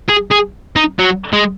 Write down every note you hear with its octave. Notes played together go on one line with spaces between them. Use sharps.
G#4
G#4
D#4
F#3
G#3